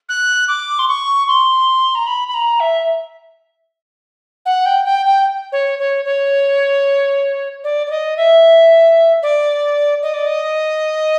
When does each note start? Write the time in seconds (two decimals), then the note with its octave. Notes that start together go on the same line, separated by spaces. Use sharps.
0.09 F#6
0.48 D6
0.79 C6
0.88 C#6
1.28 C6
1.95 A#5
2.07 B5
2.28 B5
2.34 A#5
2.60 E5
4.46 F#5
4.66 G5
4.85 G5
5.06 G5
5.52 C#5
5.79 C#5
6.05 C#5
7.64 D5
7.87 D5
7.90 D#5
8.17 E5
9.23 D5
10.02 D#5
10.14 D5
10.27 D#5